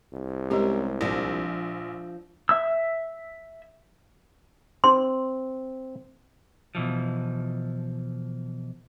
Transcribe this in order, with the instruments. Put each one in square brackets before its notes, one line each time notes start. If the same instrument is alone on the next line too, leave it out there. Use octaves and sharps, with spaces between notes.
[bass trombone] C2
[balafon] G#3 G4 [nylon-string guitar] C4 C#4 A#4
[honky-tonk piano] A#1 [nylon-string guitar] F3 D4
[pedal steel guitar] E5 E6
[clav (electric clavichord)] C4 [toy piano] C6
[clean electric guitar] B2 E3 F3